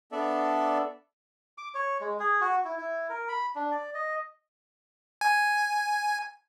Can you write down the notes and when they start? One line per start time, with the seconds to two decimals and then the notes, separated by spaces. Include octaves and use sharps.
0.12 B3 D4 A4 D5 E5
1.58 D6
1.74 C#5
2.01 G#3
2.19 G#4
2.41 F#4
2.65 E4
2.78 E4
3.10 A#4
3.28 B5
3.55 D4
3.71 D5
3.95 D#5
5.21 G#5